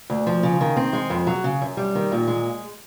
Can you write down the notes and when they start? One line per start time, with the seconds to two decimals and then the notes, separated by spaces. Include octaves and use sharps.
0.10 D2
0.27 F3
0.43 C#3
0.61 D#3
0.77 C4
0.93 G#3
1.10 F2
1.27 F#3
1.44 C#3
1.62 F#2
1.77 G3
1.95 D#3
2.12 A#2
2.28 G#3